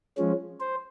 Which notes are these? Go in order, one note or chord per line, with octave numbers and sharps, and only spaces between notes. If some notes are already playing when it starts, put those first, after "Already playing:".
F3 G#3 C#4
C5